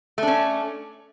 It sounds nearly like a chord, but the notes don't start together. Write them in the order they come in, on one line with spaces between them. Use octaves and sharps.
A3 D4 C#4